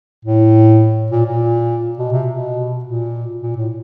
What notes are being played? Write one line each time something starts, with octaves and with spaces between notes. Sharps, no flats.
A2
A#2
A#2
B2
C3
B2
A#2
A#2
A2